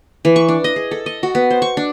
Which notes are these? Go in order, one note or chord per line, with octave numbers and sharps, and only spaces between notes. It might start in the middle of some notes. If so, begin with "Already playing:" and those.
E3
C#6
D4
D#5
G#4
A4
D#5
F#4
B3
C5
C#6
D4